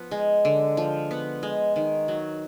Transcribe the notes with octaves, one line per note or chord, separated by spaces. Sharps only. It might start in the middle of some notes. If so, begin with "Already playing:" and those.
Already playing: F3 B3
G#3
D3
F3
B3
G#3
D#3
F#3